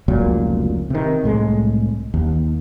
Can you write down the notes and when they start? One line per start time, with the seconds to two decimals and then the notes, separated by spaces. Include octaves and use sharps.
0.08 F1 C#2 A#2 F#3
0.90 C3 D#3
1.24 C2 A2 G#3
2.14 D#2